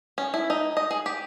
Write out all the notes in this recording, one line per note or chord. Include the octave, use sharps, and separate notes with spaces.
C#4
E4
D#4
D#5
G#4
G4